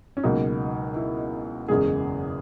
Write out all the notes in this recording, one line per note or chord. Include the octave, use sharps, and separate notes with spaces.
C#4
C#2 B2 F#3 A#3 D#4
E4
F#1 E2 C#3 G#3 G#4